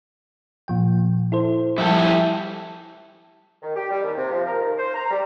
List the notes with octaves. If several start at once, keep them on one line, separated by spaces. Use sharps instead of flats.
A#2 F3 G5
E4 A4 C5
F3 G3 E4 G4 A4
D#3
G4
G3
D#2
C3
F3
A#4
D#3
C5
A#5
G3